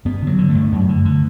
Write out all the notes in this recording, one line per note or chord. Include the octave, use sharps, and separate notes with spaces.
G2 B3
D3 F#3
D3
A3
G2
F#2
D3
D3